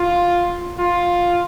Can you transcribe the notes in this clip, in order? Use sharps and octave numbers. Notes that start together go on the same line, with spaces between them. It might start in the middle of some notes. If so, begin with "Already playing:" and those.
Already playing: F4
F4